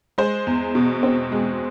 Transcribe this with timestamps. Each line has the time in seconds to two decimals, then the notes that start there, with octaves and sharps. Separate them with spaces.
0.18 G#3 C5
0.47 E2
0.75 B2
1.03 C4
1.32 G#3